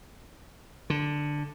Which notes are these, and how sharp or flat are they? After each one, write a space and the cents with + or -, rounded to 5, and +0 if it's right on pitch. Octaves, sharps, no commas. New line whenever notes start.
D3 +0